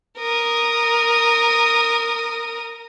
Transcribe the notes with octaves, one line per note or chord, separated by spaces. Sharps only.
A#4 D#6